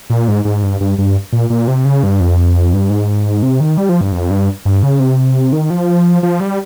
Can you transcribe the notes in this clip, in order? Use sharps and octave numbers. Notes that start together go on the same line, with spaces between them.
A#2
G#2
G#2
G2
G2
G2
A#2
A#2
C3
C#3
G2
F2
G2
G#2
C3
D#3
G3
F3
G2
F2
G2
G2
C#3
C3
D#3
F3
F3
G3